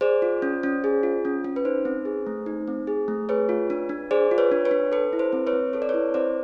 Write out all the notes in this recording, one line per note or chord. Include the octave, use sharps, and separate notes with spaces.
G#4 C5 D5
F4
C#4
C#4
G#4
F4
C#4
C#4
B4
D#4 C5
C4
G#4
A3
D#4
C4
G#4
A3
G#4 B4 C#5
F4
D4
D4
G#4 C5 D5
F4
B4 C#5
D4
B4 C#5
D4
A4 B4
E4
C5
C4
B4 C#5
C4
A4 C#5
D5
E4 B4 C#5
C4 C5 D5